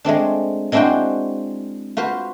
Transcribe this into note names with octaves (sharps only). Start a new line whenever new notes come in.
G#3 A3 C4 D4
G#3 C4 D4 E4 F#4 G5
F4 F#4 B4 C5